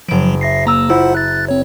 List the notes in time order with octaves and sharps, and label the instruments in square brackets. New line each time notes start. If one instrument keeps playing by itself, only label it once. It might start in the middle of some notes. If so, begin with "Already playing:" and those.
[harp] F#1 D7 [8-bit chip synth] F3 F#3
[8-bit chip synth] E5 A#6 C7
[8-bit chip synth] A#3 [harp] A#5 E6
[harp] E4 [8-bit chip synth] F4 C5 F#5
[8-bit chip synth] F#6 A6
C4 C#5